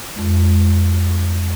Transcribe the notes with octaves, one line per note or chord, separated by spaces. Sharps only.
F2 G#3